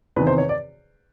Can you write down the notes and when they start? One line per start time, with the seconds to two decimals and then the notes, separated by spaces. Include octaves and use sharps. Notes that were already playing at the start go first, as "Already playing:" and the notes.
0.16 E2 C3 D#3 B4
0.27 C5
0.38 C#5
0.49 D5